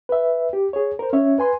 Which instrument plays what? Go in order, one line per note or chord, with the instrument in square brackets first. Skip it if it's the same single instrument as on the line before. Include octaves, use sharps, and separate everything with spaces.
[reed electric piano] B4 E5
G4
G#4 C#5
A#4 C5
C#4 C#5 E5
B4 G#5 C6